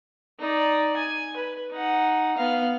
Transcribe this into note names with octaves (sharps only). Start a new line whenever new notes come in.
D#4 D5
G#5
B4
D#4 F#5
B3 F5